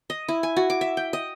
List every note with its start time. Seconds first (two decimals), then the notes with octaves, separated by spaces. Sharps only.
0.10 D#5
0.29 E4
0.43 G#5
0.57 F#4
0.70 D6
0.81 E5
0.97 G5
1.13 D#5